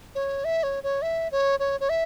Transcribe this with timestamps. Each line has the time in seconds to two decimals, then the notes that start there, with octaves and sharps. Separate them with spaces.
0.15 C#5
0.45 E5
0.63 C#5
0.83 C#5
1.02 E5
1.32 C#5
1.60 C#5
1.80 C#5
1.89 E5